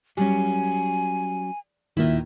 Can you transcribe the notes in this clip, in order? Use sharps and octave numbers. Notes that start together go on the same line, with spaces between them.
F#3 G3 C#4 G#5
D#2 A#2 D#3 E4 E5